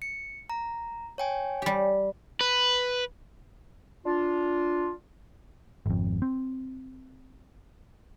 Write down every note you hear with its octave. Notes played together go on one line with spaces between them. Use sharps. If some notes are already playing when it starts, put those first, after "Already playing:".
C#7
A#5
C#5 G5 G#5
G3 G4
B4
D4 F4
G#1 F2
C4